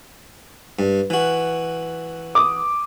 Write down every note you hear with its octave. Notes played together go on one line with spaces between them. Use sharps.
G2
E3 F#4
D6 D#6